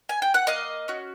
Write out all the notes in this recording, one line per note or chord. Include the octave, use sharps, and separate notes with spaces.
G#5
G5
F#5
A#3 D#5 F5
C#4 F#4